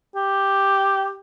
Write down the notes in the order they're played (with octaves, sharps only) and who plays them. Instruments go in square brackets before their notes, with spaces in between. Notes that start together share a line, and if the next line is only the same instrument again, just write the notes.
[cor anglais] G4